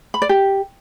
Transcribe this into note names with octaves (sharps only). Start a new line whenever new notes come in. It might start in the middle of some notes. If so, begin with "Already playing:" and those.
B5
D5
G4